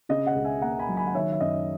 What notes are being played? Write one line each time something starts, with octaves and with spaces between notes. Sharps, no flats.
C#3 D#5
D#5 F#5
C#2
E5 G#5
A#3 F#5 A#5
G#5 B5
F#3
G#5 B5
F#5
D#3 C#5 E5
E5
F#2 D#5